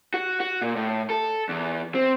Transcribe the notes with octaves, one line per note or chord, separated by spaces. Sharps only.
F#4
F#4
A#2
A2
A4
E2
C4